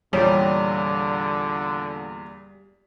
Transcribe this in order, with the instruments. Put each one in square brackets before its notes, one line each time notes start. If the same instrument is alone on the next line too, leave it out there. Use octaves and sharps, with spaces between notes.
[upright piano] E2 A#2 [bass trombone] D3 [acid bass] G3 [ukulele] C#5